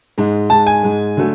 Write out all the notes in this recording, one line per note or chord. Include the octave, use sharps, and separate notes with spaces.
G#2 G#3
G#2 G#3 A5
G#5
G#2 G#3
D3 F#3 A3